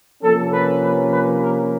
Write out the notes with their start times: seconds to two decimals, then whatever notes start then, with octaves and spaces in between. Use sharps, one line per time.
0.21 C3 F3 A#3 C#4 A4
0.50 B4
0.80 B4
1.09 B4
1.39 A#4